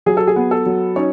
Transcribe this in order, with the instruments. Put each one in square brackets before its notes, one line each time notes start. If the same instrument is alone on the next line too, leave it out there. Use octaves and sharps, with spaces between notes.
[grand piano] F#3 G#4
A4
G#4
B3
A4
F#3
C#4 D#4 C#5